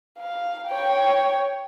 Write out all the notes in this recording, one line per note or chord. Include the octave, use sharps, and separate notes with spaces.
F5
C#5 G5